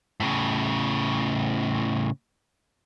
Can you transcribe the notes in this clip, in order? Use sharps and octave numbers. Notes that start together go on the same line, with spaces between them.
A2 C#3